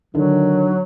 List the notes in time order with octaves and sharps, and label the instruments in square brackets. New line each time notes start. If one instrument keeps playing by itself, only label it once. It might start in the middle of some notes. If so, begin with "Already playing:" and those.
[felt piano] D3 [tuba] D#3 [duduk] F#3